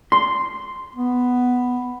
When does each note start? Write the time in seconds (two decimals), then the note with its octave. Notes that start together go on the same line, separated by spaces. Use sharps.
0.12 C6
0.96 B3